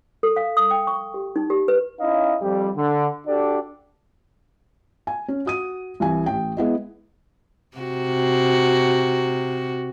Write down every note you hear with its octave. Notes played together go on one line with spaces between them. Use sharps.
A4
F5
D#6
G5
C#6
G4
D#4
G4
B4
C#4 D#4 E4 D#5 F5
F2 G3
D3
D4 F#4 G4 A4 D5
G#5
C#4
F#4 D#6 D#7
C2 E3 G#5
A1 G5
G#3 B3 E4 D#5
C3 F#4